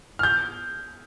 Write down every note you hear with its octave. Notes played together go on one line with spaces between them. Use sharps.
F6
G6